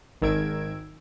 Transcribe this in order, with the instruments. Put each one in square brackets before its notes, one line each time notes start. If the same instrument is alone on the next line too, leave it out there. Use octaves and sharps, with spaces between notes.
[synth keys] G#1 D#3 A#4 E6 G#6 D7